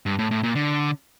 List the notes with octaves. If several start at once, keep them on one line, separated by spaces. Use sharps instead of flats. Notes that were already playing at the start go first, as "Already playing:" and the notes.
G2
A2
A2
A#2
D3